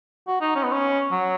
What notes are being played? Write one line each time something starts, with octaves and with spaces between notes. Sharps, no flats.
F#4
D#4
C#4
B3
C#4
F#3